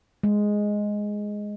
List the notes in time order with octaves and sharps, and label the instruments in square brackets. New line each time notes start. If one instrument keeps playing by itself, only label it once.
[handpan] G#3